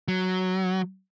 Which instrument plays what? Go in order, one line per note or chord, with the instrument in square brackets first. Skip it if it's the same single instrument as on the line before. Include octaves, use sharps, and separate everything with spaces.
[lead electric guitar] F#3